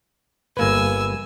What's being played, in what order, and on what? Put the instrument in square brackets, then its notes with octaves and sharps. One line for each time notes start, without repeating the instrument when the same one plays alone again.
[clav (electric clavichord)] G1 A#3 B4 [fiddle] G#5 E6